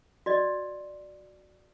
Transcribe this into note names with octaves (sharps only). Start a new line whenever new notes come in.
F#4 D5 D#5